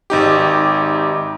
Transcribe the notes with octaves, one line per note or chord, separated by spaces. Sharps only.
G#1 D#4 G4